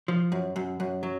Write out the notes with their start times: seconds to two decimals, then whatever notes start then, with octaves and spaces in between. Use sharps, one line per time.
0.08 F3
0.32 F#2
0.56 F#2
0.80 F#2
1.03 F#3